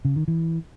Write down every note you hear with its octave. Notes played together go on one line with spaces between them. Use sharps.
C#3
D#3
E3